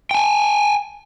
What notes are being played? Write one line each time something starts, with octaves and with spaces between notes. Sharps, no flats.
G5 G#5